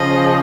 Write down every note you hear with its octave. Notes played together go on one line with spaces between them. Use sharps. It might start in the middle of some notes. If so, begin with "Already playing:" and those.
Already playing: C#3 F3 D#5